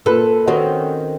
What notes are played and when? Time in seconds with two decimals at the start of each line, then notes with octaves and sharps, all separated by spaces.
0.06 A#2 A4 B4
0.47 D#3 C4 C#4 F#4 B4